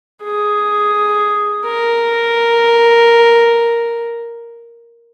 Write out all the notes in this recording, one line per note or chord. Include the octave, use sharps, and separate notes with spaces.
G#4
A#4